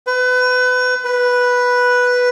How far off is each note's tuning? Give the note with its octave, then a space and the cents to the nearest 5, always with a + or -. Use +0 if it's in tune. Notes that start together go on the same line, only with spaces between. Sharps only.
B4 +30
B4 -5